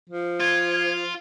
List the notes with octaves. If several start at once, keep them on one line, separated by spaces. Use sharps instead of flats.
F3
F4 G#6